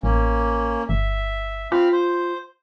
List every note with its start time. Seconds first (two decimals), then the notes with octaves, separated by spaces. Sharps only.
0.03 A1 A#3 C#4
0.89 G1 E5
1.72 C4 F4 F5 B5
1.92 C5